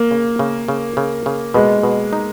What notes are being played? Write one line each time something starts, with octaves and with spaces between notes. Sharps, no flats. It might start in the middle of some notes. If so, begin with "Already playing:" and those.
Already playing: A#3
C#3
C#3
C#3
C#3
C#3
B2 G#3
B2
D#4